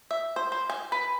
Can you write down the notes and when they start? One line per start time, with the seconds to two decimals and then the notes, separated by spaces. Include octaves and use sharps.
0.11 E5
0.36 C5
0.52 C5
0.70 G#5
0.92 B4